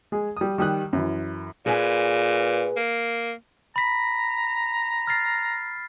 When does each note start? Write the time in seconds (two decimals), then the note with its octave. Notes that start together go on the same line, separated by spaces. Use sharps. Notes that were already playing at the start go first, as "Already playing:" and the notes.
0.12 G#3 G#4
0.37 G3 D#6
0.58 D#3 G3 D#6 F#6
0.93 F#2 E3
1.66 A#2 G#4 B4 G#5
2.76 A#3
3.76 A#5 B5 B6
5.07 F6 A6 C7